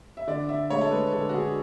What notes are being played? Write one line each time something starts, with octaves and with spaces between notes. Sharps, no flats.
E5
D3 D5
D3 E5
G#3 C#5
A4
G#3 B4
D3 A4
F#4
D3 G#4